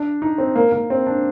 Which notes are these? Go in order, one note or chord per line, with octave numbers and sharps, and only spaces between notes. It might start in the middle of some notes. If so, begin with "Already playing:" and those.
Already playing: D4
D#4
C4
A#3
A#3
C4
D4